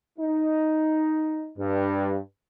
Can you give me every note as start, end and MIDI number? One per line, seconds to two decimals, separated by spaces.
0.19 1.49 63
1.58 2.16 43